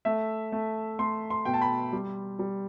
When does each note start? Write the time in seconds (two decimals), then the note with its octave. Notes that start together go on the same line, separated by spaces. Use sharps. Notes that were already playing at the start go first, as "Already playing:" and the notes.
0.05 A3 E5
0.52 A3
0.99 A3 C6
1.30 C6
1.45 B2 G5
1.54 A5
1.61 B5
1.93 G3
2.39 G3